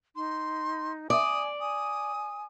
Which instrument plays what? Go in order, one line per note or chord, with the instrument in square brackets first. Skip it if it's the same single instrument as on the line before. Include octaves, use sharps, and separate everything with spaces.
[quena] D#4 [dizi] C6
[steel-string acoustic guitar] D5 [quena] G#5 [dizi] D#6
[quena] G#5 [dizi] D#6